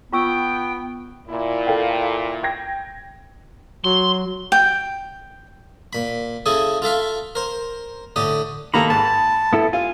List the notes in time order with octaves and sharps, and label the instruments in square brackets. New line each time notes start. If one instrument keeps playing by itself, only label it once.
[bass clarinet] B3 [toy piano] F4 C#6 E6 [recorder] G5
[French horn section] A#2 E4
[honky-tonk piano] A4 F5 G5
G5 G#6 A#6
[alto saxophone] F#3 [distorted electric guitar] C6
[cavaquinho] G5
[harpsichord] A#2 B5
C#3 E4 G#4 A4 D#6
F4 A4 E5 F5
A#4 C5
A2 D3 G4 D#6
[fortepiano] D#3 A#3 A4 [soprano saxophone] A#5 [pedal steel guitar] B5
[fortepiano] G#2 [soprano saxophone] A5
[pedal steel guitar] B3 E4 A4
[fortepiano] F4 F5 [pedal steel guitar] G#5